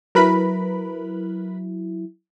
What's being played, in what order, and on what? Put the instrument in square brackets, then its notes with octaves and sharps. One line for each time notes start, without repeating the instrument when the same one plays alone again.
[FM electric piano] F#3 E4 [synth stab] A#4 B4 B5